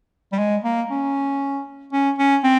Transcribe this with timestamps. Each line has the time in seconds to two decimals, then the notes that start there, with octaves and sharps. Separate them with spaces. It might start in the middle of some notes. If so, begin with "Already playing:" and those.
0.33 G3
0.38 G#3
0.64 A#3
0.91 C#4
1.93 C#4
2.18 C#4
2.44 C4